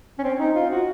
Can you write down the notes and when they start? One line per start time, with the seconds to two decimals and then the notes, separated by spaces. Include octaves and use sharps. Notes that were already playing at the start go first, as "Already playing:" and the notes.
0.19 C#4
0.24 C4
0.39 D#4
0.55 F4
0.70 F#4